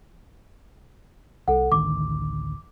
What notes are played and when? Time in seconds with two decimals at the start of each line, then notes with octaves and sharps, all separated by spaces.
1.48 C2 A4 F#5
1.72 A1 D2 D#3 D6